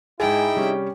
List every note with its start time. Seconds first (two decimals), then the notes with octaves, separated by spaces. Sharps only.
0.20 G#2 D#4 E4 G#4 G5 G#5
0.56 C3 G3 C#4